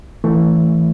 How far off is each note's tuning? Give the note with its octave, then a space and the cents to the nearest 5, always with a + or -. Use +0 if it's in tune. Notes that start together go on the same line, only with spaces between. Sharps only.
E3 +0 A3 +20